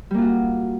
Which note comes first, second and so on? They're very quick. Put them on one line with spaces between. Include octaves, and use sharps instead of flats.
G3 A#3 F4 F#4